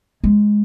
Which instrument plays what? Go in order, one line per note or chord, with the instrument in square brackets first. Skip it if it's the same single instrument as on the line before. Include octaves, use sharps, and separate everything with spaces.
[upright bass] G#3